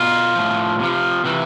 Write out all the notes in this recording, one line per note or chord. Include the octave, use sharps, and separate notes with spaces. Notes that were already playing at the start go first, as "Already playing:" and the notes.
Already playing: B2 F4
A2 F3
C3 F3
C3 E3